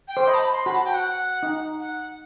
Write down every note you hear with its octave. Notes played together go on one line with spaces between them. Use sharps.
G5
C5
D#5 B5
A5
B5
C6
F#4 B5
A5
G5
F#5
D#4
F#5